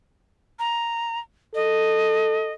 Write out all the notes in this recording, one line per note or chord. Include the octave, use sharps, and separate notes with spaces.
A#5
A4 D#5